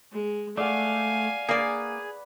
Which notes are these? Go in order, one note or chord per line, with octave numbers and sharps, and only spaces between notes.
G#3
A3 D5 F5 F#5 G#5
A#3 G#4 B4 D5